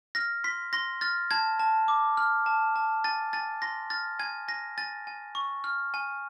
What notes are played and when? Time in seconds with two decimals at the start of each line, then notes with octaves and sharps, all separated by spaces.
0.15 F6 A#6
0.44 C6 B6
0.73 C6 A#6
1.01 F6 A6
1.31 A5 G#6
1.60 A5
1.88 D6
2.17 F6
2.46 A5
2.76 A5
3.04 G#5 A6
3.33 G#5 A6
3.62 C6 A#6
3.90 F6 A6
4.19 G#5 G#6
4.48 G#5 A#6
4.78 G#5 A6
5.07 G#5
5.35 C#6
5.64 F6
5.94 G#5